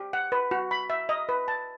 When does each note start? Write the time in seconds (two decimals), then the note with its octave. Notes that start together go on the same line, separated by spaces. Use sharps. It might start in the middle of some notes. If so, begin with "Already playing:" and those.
Already playing: G4
0.13 F#5
0.32 B4
0.51 F#4
0.71 B5
0.90 E5
1.09 D#5
1.29 B4
1.48 A5